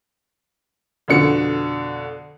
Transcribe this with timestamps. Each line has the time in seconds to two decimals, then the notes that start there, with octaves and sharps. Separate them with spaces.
1.08 F2 B2 D3 C#7